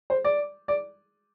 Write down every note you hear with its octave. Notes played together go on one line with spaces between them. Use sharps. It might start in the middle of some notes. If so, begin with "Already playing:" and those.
C5
D5
D5